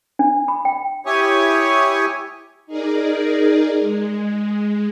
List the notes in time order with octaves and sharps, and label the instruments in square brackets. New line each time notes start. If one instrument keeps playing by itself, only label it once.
[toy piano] D4
B5
G5
[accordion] E4 G4 C#5 G#5 C#6 D#6
[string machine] D#4 G#4 A#4 D5
G#3